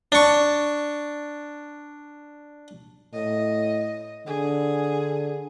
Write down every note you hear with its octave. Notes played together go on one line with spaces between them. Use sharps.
D4 C#6
A2 D#5
D3 G#4